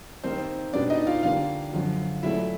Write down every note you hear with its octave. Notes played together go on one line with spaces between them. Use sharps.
D#3 G3 A#3 C4 D#4 C5
B2 G3 B3 D4 D5
D#4 D#5
F4 F5
D3 G3 A#3 D4 F4 F5
F#2 D3 F3
A#2 F#3 A3 E4 E5